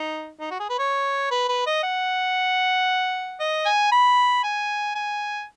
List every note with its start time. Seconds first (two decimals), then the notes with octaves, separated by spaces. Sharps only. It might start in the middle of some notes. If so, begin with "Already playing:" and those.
Already playing: D#4
0.40 D#4
0.51 F#4
0.60 G#4
0.69 B4
0.79 C#5
1.31 B4
1.49 B4
1.66 D#5
1.83 F#5
3.40 D#5
3.66 G#5
3.92 B5
4.44 G#5
4.95 G#5